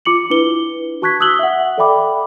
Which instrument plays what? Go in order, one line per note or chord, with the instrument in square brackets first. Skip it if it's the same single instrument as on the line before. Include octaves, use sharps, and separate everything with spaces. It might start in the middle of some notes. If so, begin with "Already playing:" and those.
[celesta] F4 D6 C#7 F#7
D4 E4 B4 G7
F#4 A5 C#6 F#6 G#6 B6
D#6 E6 F#6 F#7 G7
E5 F#5
A4 D5 E5 G5 B5 D6